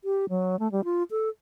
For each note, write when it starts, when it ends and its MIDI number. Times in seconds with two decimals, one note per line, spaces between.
0.04 0.26 67
0.29 0.59 54
0.59 0.71 57
0.72 0.84 55
0.84 1.03 65
1.11 1.29 69